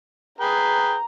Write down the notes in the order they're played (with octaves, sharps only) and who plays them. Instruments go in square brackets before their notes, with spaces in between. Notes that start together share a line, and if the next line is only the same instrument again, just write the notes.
[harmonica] G#4 B4 G5 [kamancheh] A#5